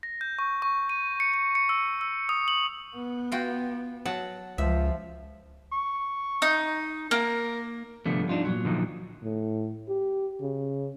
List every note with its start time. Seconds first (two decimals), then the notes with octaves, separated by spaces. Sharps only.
0.03 A#6
0.21 G6
0.39 C#6
0.62 C#6
0.89 D#7
1.20 C#7
1.34 C#7
1.55 C#7
1.69 E6
2.01 E6
2.29 D#6
2.48 F#7
2.96 B3
3.32 F4 F#4 G5
4.05 F#3 F#5 A5
4.58 C#2 F3 E5
5.72 C#6
6.42 D#4
7.11 A#3 A#4
8.06 C2 D3 F3 G3 A3 B3
8.29 D4 D#4 F4
8.45 A#2 C#3 F#3
8.65 D3 F3 D#4
9.23 A2
9.89 G4
10.41 C#3